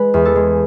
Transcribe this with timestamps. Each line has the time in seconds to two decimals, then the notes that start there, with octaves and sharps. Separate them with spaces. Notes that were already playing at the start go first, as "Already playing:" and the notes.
Already playing: G#3 B4
0.14 E2
0.25 A4
0.36 G#3